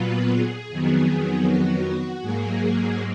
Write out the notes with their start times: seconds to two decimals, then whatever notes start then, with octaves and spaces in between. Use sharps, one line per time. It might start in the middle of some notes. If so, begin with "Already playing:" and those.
Already playing: A#2 F#3 B3 F4 B4
0.31 G#4
0.69 F2 D#3 F#3 B3
1.46 F#4
2.21 G#2 F#3 A#3 G#4